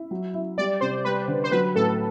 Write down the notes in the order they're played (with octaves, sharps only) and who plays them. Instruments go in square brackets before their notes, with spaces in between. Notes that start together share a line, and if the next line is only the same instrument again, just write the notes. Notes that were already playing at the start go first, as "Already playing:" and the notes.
Already playing: [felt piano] E4
F#3
E4
[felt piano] G3 [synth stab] D5
[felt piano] C3 [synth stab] C5
[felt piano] G3 [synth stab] B4
[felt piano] D3
[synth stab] C5
[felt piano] F#3 [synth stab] B4
[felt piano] A2 [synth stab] A4